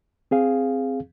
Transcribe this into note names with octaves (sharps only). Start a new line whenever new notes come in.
C4 G#4 F5